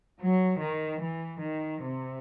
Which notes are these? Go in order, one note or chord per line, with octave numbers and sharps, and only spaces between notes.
F#3
D#3
E3
D#3
C3